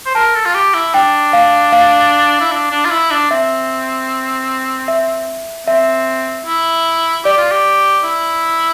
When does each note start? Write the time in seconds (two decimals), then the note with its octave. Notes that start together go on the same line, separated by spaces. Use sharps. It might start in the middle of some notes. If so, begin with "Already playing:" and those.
0.06 C5
0.15 A#4 A5
0.35 A4
0.46 F4
0.55 G4
0.75 E4
0.94 D4 G5
1.33 F5
1.73 F5
2.41 E4
2.52 D4
2.71 D4
2.85 F4
2.91 E4
3.11 D4
3.30 C4 E5
4.88 E5
5.67 C4 E5
6.46 E4
7.25 G4 D5
7.38 F4
7.51 G4
8.04 E4